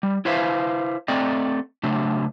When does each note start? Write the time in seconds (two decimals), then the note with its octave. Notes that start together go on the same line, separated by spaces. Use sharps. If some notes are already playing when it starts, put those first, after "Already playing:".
0.03 G3
0.25 E4 B4 C5 E5 F5
1.08 A3 C4 D5 D#5
1.83 C#3 F#3 A3 D4